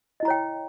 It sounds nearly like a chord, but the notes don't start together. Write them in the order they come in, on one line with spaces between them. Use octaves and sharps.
D#5 E4 A#5 C#5 G5